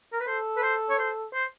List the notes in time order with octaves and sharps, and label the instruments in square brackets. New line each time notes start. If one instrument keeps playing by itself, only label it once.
[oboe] A#4
B4
[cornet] A4 [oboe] C5
[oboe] B4
C5
C#5
C5
C5